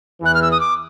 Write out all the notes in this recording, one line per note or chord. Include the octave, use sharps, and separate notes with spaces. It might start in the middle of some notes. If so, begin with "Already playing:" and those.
E2 E3 F#6
F6
E6
D#6
D6